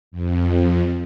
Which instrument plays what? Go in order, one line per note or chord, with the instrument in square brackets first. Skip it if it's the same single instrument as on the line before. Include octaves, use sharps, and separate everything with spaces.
[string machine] F2